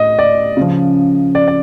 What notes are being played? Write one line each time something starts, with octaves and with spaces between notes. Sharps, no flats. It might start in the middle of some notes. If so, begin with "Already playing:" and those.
Already playing: A2 D#5
D5
C#3 F3
D5
D5